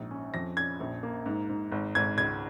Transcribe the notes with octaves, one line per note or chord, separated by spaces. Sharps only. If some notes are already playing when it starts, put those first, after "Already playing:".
Already playing: A#1 G#2
C#4
F2 A#6
C#4 G#6
A#1
A#3
G#2
G#2
G#1
G#1 G#6
C#2 G#6